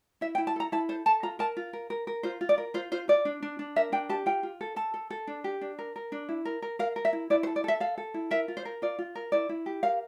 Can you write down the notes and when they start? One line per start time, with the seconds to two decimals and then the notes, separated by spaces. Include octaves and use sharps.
0.21 E4 E5
0.35 G5
0.38 E4
0.47 A5
0.56 A4 A#5
0.72 E4 A5
0.89 A4 C5
1.06 A4 A5
1.23 F4 A#5
1.39 A#4 A5
1.57 F4
1.73 A#4
1.90 A#4
2.07 A#4
2.23 F4 C5
2.41 F4
2.49 D5
2.58 A#4
2.74 F4 C5
2.92 F4 C5
3.08 F4 D5
3.25 D4
3.42 D4
3.59 D4
3.76 A#4 E5
3.92 D4 G5
4.09 G4 A5
4.26 F4 G5
4.43 F4
4.61 A4
4.76 A4 A5
4.94 A4
5.10 A4
5.27 D4
5.44 G4
5.61 D4
5.79 A#4
5.96 A#4
6.12 D4
6.29 E4
6.45 A#4
6.62 A#4
6.79 A#4 F5
6.96 A#4
7.05 E5
7.13 E4
7.30 E4 D5
7.43 C5
7.47 A4
7.56 D5
7.64 A4 E5
7.80 A4 F5
7.98 A4
8.14 E4
8.31 A#4 E5
8.48 F4
8.57 C5
8.65 A#4
8.82 F4 D5
8.99 F4
9.15 A#4
9.32 E4 D5
9.49 E4
9.66 G4
9.83 A#4 F5